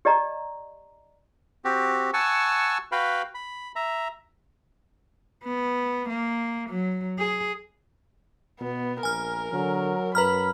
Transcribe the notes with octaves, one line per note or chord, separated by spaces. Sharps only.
G4 D5 D#5 A#5
C4 F#4 G4
F#5 G#5 A5 C#6 E6
F#4 B4 F5 G5 B5
B5
E5 A#5
B3
A#3
F#3
G#4
B2 B3
A#1 A#4 G#5 F6
D3 F#3
F#2 B4 A#5 B5 F6